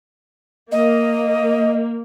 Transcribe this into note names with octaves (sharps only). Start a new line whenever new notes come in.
A#3 D#5